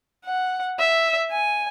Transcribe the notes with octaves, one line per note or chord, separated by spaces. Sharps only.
F#5
E5
G#5